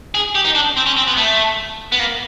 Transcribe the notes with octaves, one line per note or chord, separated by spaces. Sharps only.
G#4
G4
D#4
D4
C4
C#4
C4
B3
A3
B3
A#3